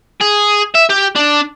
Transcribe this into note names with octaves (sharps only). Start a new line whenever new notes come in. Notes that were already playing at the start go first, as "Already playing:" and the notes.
G#4
E5
G4
D4